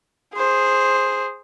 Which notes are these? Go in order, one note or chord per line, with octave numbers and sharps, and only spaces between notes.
G#4 C5